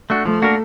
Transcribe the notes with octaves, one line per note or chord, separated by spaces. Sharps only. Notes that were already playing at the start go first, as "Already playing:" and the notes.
A3 D4 F#4
F3 A3
A#3 D4 F#4 A#4